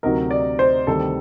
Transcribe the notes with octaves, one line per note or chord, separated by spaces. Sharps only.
D2 C3 F#3 C4 D#4 A#4
D5
C5
D2 C3 D#3 G3 A4